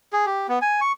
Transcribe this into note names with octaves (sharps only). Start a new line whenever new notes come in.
G#4
G4
B3
G#5
C#6